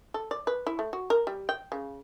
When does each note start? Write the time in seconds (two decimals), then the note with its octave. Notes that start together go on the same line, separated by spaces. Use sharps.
0.14 A4
0.31 D5
0.47 B4
0.67 E4
0.79 A3
0.93 F#4
1.10 A#4
1.27 G3
1.49 G5
1.72 C#3